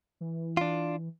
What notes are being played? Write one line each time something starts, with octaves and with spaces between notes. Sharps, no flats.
E3
D4 F4